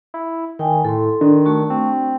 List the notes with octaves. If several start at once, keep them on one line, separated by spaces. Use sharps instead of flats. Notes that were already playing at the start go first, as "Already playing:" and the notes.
E4
D#3 G5 G#5
A2 A4 C6
D#3 D4
A3 F#4 C#6
C4